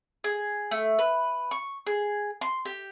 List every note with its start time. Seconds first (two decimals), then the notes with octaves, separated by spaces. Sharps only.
0.24 G#4
0.71 A3
0.99 B4
1.51 C#6
1.87 G#4
2.41 C6
2.65 G4